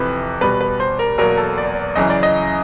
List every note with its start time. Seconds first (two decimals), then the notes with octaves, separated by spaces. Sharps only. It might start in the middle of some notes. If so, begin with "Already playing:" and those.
Already playing: F2 C3 E3 B4
0.41 E2 B2 G3 B4
0.61 B4
0.80 C5
0.99 A#4
1.18 E2 B2 F#3 A#3 A#4
1.38 A4
1.58 D5
1.96 F#2 C#3 E3 D#5
2.10 D5
2.23 D#5